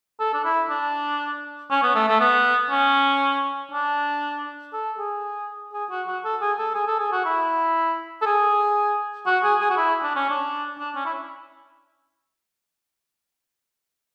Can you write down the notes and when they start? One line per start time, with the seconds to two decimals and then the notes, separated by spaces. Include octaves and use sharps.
0.20 A4
0.34 D4
0.44 E4
0.70 D4
1.71 C#4
1.83 B3
1.95 A3
2.08 A3
2.20 B3
2.70 C#4
3.72 D4
4.73 A4
4.98 G#4
5.73 G#4
5.90 F#4
6.07 F#4
6.24 A4
6.41 G#4
6.58 A4
6.74 G#4
6.87 A4
6.99 G#4
7.12 F#4
7.25 E4
8.22 A4
8.26 G#4
9.26 F#4
9.43 G#4
9.61 G#4
9.70 F#4
9.77 E4
10.03 D4
10.16 C#4
10.30 D4
10.78 D4
10.95 C#4
11.05 E4